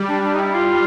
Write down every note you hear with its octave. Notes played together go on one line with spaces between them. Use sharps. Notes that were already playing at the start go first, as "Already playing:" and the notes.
Already playing: G3
D4
D4
D#4
E4
F4